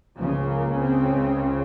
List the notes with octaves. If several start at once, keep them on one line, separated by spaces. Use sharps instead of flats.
C#2 C#3 F3
A#3
C4